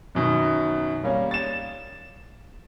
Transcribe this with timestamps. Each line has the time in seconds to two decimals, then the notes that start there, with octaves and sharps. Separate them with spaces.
0.15 F#2 B2 D#3
1.04 G3 A#3 C#4
1.31 A6 E7